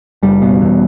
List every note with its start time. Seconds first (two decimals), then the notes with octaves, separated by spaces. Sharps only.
0.23 F#1 G3
0.42 B2
0.61 E2